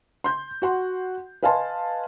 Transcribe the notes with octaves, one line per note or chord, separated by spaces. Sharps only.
C6 G6
F#4 F#5 C6
B4 D#5 F5 G#5 A5 C6